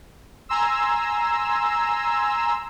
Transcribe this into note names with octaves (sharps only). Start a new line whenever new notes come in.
G#5 A#5 C6 E6